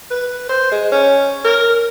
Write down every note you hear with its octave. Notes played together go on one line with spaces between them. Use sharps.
B4
C5
G#3
C#4
A#4